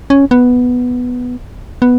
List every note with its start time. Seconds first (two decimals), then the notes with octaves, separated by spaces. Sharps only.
0.10 C#4
0.31 B3
1.82 B3